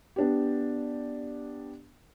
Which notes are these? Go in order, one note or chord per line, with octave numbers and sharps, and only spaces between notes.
B3 D4 G4